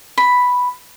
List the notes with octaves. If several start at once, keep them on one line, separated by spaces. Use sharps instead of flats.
B5